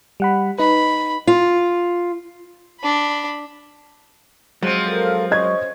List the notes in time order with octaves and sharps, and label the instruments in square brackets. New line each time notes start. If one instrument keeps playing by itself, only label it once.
[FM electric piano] G3 F#5 B5
[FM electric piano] D#4 B4 [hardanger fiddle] B5
[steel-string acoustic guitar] F4
[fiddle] D4 B5
[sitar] F3 C4 [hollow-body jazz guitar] F#3 G#3
[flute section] A4 A#4 F5
[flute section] C#4 C5 C#6 [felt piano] D#5 G#6